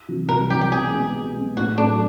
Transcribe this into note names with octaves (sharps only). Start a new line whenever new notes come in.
C3 E3
C2 A#4
C3 E3 G4
G4
B2 G#4
G#3 B3
B2
G#3 B3
A2 F#4
F#3 A3 D4